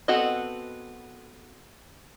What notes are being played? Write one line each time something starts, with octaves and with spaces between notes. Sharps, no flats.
B3 C4 F#4 A4 D#5